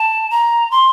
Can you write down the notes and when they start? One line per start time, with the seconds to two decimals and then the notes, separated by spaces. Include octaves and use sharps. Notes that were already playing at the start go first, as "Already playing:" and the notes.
Already playing: A5
0.30 A#5
0.71 C6